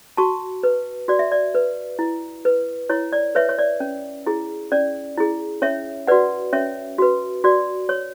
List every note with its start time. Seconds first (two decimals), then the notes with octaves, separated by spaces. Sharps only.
0.17 F#4 A5 C#6
0.63 B4
1.08 F#4 D5
1.19 E5
1.32 D5
1.55 B4
1.99 E4
2.45 B4
2.90 E4 C#5
3.13 D5
3.35 B4 C#5 E5
3.49 C#5
3.59 D5
3.80 C#4
4.26 E4 G#4
4.72 C#4 D5
5.18 E4 G#4
5.62 C#4 C#5 E5
6.07 F#4 B4 D5 F#5
6.53 C#4 C#5 E5
6.98 F#4 B4
7.44 F#4 D5
7.89 C#5